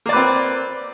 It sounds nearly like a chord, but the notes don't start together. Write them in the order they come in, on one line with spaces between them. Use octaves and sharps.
A#3 D5 B4 C4